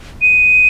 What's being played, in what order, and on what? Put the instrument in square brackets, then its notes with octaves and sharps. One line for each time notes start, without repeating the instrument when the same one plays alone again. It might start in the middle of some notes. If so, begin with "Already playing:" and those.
[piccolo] D#7